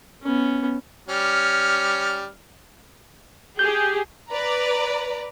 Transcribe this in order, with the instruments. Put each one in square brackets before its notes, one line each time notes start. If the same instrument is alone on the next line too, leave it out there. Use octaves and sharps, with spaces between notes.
[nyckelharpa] B3 C#4
[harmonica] G3 C#4 F6
[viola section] G4 G#4 [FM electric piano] G6
[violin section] B4 D5 A#5